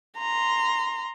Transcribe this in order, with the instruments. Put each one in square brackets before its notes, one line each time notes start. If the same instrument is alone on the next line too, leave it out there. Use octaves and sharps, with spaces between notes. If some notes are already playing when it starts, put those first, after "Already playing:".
[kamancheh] A#5 C6